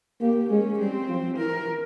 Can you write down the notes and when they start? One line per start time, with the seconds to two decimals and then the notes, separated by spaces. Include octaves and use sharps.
0.21 A#3 G4
0.50 G#3 C#4
0.79 G3 C4
1.08 F3
1.37 E3 A#4